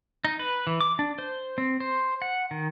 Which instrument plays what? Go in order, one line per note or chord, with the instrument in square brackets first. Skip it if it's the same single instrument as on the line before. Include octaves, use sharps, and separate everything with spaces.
[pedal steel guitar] D#4
B4
E3
D6
D4
C5
C4
C5
F#5
D#3